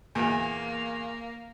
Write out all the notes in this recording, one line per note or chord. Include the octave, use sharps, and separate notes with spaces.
E2 A#2 A#3